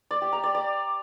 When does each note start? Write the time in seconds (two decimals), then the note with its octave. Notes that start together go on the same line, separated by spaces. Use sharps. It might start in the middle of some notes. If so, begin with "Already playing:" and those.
0.11 D5
0.22 G4
0.33 A#5
0.43 D5
0.54 D5